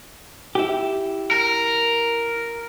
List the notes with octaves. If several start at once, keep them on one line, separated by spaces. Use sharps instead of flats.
E4 G4
A#4